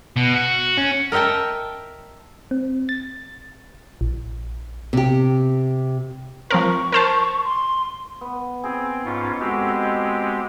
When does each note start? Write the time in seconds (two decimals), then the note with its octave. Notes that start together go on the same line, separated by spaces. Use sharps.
0.16 B2
0.34 F#4
0.78 C#4
1.12 A#4 D#5 E5 G5 A5
2.51 C4
2.89 A6
4.01 A#1
4.93 C3 G4
6.51 F3 C4 A#4 C#6
6.92 A#4 C5 A5
7.44 C6
8.21 B3
8.64 C4 G#4
9.05 G#2 C#4 F4
9.40 G#3 C4 F#4 G4 A4
9.69 D#5